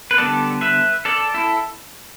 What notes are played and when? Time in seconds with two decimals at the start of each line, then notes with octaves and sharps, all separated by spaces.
0.11 B4
0.18 D3 G3 B3 A4 D5
0.61 B4 E5
1.05 A4 D5
1.34 E4 A4